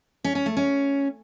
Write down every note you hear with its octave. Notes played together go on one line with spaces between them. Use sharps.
C#4
C#4
A3
C#4